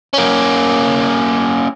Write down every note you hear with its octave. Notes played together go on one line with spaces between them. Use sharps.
A#3 C#4